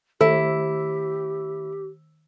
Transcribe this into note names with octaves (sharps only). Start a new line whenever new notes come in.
D#3 E4 G4 A4 E6